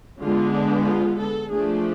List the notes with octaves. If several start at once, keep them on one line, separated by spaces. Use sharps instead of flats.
D3 G#3 B3 F4
D4
F4
A4
F3 A3 D4 G#4